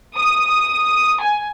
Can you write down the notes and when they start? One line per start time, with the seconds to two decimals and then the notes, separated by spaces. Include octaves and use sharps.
0.16 D#6
1.20 G#5